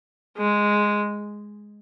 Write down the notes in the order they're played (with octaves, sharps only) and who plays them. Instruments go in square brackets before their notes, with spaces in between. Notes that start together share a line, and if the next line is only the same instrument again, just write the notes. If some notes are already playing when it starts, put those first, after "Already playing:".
[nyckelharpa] G#3